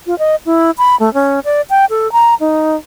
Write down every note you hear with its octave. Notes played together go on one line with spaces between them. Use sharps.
F4
D#5
E4
B5
A3
C#4
D5
G5
A4
A#5
D#4